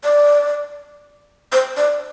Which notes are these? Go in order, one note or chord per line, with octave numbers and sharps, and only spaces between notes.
D5
C5
D5